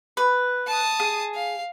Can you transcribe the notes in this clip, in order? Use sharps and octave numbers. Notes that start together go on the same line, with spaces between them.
B4
A5 D#6
G#4
F5